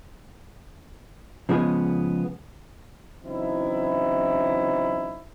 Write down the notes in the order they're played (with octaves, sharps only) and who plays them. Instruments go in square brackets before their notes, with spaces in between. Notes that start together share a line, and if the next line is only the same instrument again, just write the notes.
[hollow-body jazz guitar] C#3 F3 G#3 B3 G#4
[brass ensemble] C#3 E3 F#3 C4 D#4 E4